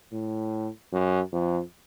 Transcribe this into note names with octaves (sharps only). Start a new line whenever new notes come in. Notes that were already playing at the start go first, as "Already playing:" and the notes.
A2
F#2
F2